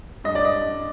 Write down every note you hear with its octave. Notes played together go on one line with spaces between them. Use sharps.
G2 D#5
D5
D#5